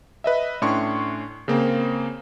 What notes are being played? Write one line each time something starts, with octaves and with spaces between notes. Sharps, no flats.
B4 D#5 E5
A2 C#4 D4 C6 C#6
C#3 A#3 C4